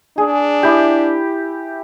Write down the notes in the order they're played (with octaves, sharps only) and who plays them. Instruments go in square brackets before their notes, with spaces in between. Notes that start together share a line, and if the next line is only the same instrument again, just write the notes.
[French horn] D4 [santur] G#4
[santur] E4 G4